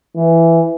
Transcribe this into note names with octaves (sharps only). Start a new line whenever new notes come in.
E3